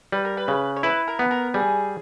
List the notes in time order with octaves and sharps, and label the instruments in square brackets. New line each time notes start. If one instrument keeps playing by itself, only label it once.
[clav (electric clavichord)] G3 [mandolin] B4
[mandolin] A#4
B4
[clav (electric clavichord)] C#3
[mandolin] C#5
[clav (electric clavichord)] E4 [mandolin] B4
[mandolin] A#4
[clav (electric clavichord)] B3
[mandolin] A#4
[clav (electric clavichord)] G3 [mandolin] G#4